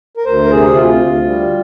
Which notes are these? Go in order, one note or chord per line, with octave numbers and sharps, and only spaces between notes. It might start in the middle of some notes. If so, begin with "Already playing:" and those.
A#4
D2 C5
A#4
C3 G#4
D2 F4
D2
G3